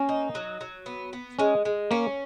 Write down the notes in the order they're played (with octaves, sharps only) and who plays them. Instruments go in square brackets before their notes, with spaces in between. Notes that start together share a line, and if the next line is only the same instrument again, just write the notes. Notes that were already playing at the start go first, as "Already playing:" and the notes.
Already playing: [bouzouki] A#3 [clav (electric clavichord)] C#4
[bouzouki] D#4
F#3
F#3
B3
B3
[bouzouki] G#3 [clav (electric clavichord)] C#4
[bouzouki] G#3
[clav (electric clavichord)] A#3 [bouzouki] C#4